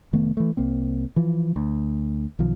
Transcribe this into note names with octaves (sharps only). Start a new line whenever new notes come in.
F1 D#3 A3 B3
E3 A3
C2 A#3 C4
E3 F3
D2
B1 D#3 F3